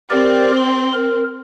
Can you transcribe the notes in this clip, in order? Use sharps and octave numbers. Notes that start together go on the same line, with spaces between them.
C4 G4 A#4 D5
C6
A#4